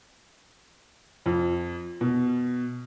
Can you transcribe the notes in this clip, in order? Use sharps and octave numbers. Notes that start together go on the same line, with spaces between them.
F2
B2